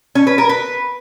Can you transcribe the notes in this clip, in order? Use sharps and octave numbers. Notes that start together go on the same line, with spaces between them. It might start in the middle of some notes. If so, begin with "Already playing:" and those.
C#4
B4
A#4
B4